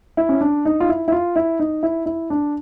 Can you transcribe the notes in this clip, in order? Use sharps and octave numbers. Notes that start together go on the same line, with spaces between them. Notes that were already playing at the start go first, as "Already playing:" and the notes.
E4
C#4
D4
D#4
F4
E4
E4
F4
E4
D#4
E4
E4
D4